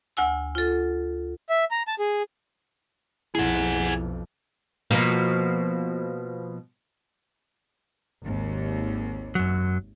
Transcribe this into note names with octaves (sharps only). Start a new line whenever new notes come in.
D2 F#5 G#5 E6
F4 A4
E5
A#5
A5
G#4
B1 F2 E4 G#4 F#5
B2 F3 A#3
G#1 D#2
F#2 F#3